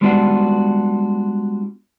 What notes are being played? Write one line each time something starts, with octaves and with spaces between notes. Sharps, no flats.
G3 G#3 B3 D4 F4 F#4